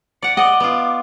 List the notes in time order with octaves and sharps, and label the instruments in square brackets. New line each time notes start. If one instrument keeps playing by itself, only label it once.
[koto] D5 F#5 [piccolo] C#7
[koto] D5 D#5 [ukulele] F#5 [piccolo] D6
[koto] B3 F4